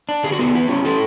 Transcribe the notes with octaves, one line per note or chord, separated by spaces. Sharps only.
D4
D3 G#4
F#4
B3 G#4
E4
C#4
E4 A4